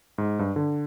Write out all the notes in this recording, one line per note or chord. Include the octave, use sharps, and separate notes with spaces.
G#2
G2
D3